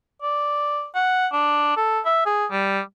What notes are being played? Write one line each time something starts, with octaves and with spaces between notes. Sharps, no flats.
D5
F#5
D4
A4
E5
G#4
G3